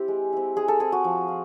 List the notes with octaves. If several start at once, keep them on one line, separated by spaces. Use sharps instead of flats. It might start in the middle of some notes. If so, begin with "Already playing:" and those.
Already playing: C4 E4 G4
G#3
C4 E4
G#3 G#4
A4
C4 E4 G#4
F#4
F3
F4